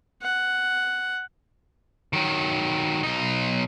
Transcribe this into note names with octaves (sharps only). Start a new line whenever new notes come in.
F#5
D#3 F#3
B1 D#4